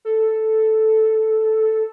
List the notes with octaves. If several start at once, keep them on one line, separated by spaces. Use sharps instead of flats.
A4